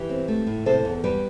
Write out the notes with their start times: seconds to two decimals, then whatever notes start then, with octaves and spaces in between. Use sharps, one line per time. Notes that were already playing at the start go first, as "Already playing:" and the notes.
Already playing: E3 G4 B4
0.09 C4
0.28 A3
0.47 A2
0.66 C3 A4 C5
0.85 E2
1.04 G3 G4 B4